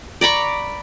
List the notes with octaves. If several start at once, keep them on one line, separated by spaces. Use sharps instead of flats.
D5 A#5 B5 C#6